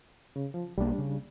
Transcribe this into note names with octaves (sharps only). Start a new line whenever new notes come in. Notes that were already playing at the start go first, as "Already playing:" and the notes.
C#3
F3
B1 G3 A#3 D4
C#3